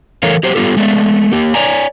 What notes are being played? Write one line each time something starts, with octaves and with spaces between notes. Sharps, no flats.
E3 A3 A4 A#4 C#5 F5
F#3 G4 C5
G3 B3 F4 G4 A4
G#3 A3 B3 D5 E5
A#3 G4
C#5 D5 G#5 A#5